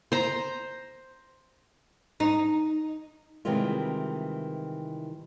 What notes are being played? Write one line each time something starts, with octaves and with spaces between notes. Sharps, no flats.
C5 A#5
D#4
C3 D#3 E3 G3 G#3 F4